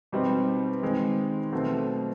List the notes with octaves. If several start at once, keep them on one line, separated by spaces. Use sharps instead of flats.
B2 G3 C4 D#4
D#3 G#3 C4
B2 F#3 A3 C4